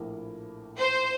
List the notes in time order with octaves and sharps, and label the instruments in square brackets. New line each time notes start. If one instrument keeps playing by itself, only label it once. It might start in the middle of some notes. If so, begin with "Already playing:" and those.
Already playing: [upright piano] A#1 A2 F3 A#3 E4
[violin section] C5